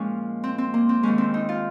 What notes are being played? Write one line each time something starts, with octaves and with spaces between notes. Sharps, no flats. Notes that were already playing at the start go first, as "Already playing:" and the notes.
Already playing: A#2 F3 G#3 C#4
C4
C4
A#3
C4
D#2 D#3 G#3 C#4
C4
D#4
F4